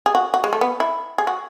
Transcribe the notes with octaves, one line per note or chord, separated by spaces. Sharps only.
G#4
F#4
F#4
G#3
A3
B3
E4
G#4
F#4